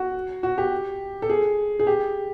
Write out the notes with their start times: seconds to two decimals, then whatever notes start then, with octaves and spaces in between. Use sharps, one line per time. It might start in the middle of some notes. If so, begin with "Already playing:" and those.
Already playing: F#4
0.43 F#4
0.58 G4
1.22 A4
1.30 G#4
1.80 G#4
1.87 G4